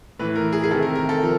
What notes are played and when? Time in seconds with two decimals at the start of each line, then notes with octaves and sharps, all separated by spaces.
0.20 A2 E3 B4
0.36 A#4
0.52 G#4
0.64 G#4
0.71 C3 D#3 A4
0.83 A#4
0.95 A#4
1.09 A4
1.22 F3